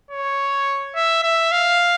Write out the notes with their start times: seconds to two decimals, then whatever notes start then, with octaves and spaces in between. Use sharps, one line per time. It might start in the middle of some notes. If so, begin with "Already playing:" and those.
0.11 C#5
0.95 E5
1.23 E5
1.52 F5